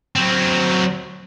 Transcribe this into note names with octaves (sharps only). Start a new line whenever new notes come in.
F#3 C4